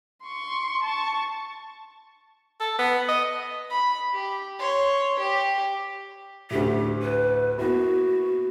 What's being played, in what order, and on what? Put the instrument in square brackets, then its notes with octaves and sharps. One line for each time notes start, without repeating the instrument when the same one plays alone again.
[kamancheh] C6 C#6
A5 C#6
[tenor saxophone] A4
B3
D#5
[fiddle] B5
G4
C#5 C6
G4
[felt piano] D2 A2 [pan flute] G4
[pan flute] B4
[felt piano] A#3 B3 E4 [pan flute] F#4